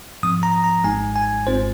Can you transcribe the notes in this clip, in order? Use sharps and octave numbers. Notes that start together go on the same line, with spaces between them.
G#2 F3 C4 D#6
A#5
A#5
G#1 G#2 G#3 D#4 G#5
G#5
G#1 G#2 G#3 C4 F4 C5